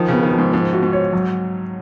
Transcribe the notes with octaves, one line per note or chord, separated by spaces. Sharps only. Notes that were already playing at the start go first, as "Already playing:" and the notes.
Already playing: D#3 F3
C#3 B3
D#3
F3
G#2
G#2 F3
F#4
G#2
C#5
F#3